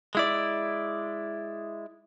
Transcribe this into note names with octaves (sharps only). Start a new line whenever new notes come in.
G#3 E4 D5